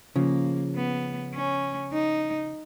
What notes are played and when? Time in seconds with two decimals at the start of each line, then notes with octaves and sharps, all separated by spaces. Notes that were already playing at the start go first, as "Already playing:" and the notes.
0.16 C#3 F3 A#3
0.75 B3
1.35 C#4
1.93 D#4